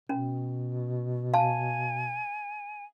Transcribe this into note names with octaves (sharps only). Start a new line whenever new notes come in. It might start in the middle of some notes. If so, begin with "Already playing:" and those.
B2 C#4
F5 G#5 A5